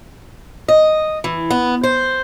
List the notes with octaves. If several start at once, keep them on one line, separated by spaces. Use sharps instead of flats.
D#5
E3
B3
C5